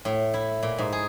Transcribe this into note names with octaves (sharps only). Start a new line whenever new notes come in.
A2
E4
A#2
G#2
G#4